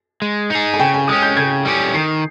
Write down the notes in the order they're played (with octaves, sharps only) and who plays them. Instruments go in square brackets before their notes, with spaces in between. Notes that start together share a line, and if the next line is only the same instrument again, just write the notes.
[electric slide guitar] G#3
D#4 G#4
[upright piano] G#5
[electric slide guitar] C#3 [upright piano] G5
[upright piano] G#5
[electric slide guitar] G#3 C#4 [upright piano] D#6
[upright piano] G6
[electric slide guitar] C#3 [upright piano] G#6
[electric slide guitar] G3 C#4 G4
[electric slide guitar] D#3 [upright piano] C7